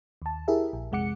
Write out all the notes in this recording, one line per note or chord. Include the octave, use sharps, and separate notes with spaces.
D#2 A5
E4 G4 G#4 A#4 E5
A#1
F2 C3 G#3 F#5 D6 C#7